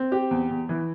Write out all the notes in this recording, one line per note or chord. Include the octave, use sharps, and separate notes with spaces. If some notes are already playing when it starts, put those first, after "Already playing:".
Already playing: C4
G4
E2
E2
E3